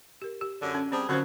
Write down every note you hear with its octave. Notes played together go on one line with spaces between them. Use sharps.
G4 A#4
G4
F#2 D3
C#4
G3 C4 D4 G#4 C5 A5
D3 F3 F#3 C#4 C5